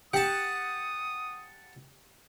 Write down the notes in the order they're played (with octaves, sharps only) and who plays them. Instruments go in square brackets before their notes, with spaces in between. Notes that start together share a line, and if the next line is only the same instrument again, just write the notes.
[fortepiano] G4 [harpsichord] F#5 A5 [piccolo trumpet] D#6